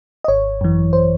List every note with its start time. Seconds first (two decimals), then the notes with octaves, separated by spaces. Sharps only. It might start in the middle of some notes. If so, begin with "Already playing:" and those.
0.24 D#5
0.28 G#1 C#5
0.61 F#2 E3
0.93 C5